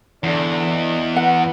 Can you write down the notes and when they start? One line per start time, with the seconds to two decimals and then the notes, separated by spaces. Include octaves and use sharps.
0.24 E2 D3
0.71 D#5
1.16 B4 F#5